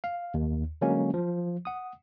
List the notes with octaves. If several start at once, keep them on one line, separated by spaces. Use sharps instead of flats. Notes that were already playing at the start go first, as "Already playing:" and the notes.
F5
D#2
D3 F#3 G#3 A#3 C#4
F3
F#5 D#6